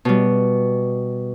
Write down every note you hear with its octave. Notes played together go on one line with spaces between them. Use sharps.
B2 G3